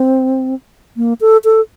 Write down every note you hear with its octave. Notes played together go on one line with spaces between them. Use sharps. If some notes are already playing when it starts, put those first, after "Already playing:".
Already playing: C4
A#3
A4
A4